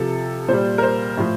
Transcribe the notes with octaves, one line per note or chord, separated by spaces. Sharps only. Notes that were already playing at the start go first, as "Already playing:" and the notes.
Already playing: C3 F3 A4
A#2 G3 C5
A#4
C5
A2 F3